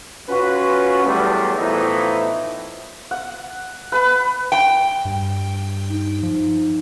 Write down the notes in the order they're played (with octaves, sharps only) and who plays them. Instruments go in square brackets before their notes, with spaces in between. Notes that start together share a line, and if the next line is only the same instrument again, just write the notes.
[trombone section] C#4 F4 F#4 B4
E2 F#3 G3 A3
A2 E3 F3 B3 D#4 E4
[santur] F#5
B4 B5
[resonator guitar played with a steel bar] G5
[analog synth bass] G2
[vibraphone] D#4
[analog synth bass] F3